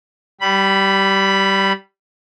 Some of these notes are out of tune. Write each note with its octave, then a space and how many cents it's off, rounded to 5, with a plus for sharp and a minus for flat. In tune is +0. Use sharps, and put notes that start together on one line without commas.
G3 -15 B5 +0